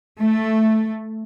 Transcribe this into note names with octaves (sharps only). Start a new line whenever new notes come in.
A3